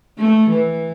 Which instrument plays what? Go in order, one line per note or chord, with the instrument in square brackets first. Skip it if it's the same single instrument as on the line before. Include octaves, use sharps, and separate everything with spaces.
[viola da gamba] A3
E3